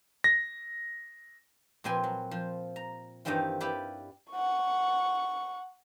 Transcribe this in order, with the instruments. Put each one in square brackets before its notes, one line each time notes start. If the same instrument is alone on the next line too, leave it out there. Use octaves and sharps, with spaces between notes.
[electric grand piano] A#6
[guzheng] A#2 F3 C4 B4 G#5 C6
F#3
F3
A#5
G2 D#3 E3 G3 C4 F4
E4 G4 B4 D5 F5
[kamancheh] F#5 C#6